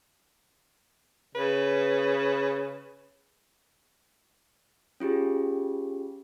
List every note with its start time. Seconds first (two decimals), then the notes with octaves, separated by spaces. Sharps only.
1.35 C#3 B4
5.00 C#4 F4 G4 G#4